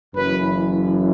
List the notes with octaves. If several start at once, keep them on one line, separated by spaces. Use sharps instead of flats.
F#1 F#2 E3 B4